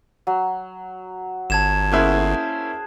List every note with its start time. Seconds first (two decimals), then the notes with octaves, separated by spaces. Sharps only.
0.27 F#3
1.50 G1 A5 G#6 E7
1.92 A#3 C#4 E4 G#4 C5 F#5